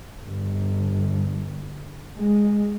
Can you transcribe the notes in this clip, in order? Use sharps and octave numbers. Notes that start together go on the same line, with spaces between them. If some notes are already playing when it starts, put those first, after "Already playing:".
G1
G#3